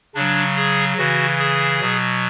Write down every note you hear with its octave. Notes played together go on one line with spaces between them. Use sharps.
C#3 F#3 D4
G#4
C#3 E3 F#4
G#4
B2 F#3